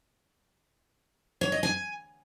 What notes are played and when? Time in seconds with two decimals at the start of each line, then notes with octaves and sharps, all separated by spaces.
1.41 C#5
1.52 D#5
1.63 G#5